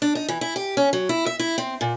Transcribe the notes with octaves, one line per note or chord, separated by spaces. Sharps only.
D4
D#4
E3
E4
G4
C#4
F#3
E4
E5
E4
C4
A#2